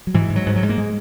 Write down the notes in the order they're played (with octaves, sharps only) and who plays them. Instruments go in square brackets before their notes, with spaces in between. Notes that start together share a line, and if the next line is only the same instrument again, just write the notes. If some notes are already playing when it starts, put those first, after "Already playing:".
[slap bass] F#3
G#2 E3
G#2
F#3
G#2
F#3
G#2
A#3
G#3